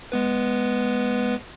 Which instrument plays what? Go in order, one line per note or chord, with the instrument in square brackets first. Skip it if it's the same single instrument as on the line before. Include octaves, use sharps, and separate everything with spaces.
[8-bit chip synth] G#3 B3 B4